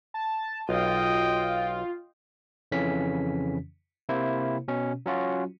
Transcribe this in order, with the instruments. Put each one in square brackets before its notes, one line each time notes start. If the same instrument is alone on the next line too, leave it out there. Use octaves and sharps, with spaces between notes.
[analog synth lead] A5
[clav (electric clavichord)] B1 [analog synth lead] F4 [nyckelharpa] D#5 G5
[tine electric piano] F2 C#3 E3 C#4 B6
C3 A#3 E4 C5
B2 C#4
F#3 C#4 F4 F#4